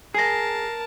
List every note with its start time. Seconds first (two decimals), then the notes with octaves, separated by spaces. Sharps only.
0.14 G#4 A#4 A5 A#6 C7